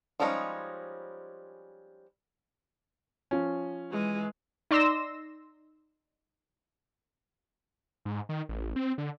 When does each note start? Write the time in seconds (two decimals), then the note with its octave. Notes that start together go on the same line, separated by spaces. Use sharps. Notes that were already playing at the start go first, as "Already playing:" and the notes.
0.20 F3 G3 G#3 C#4 D#4
3.31 F3 C#4
3.91 E3 G#3
4.71 D#4 D5 C6 E6 A#6 E7
8.05 G#2
8.29 D#3
8.49 A1
8.76 C4
8.98 D3